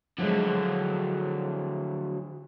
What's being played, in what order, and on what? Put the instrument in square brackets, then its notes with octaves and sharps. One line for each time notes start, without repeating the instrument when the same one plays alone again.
[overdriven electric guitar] D3 F#3 [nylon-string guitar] F3 G#3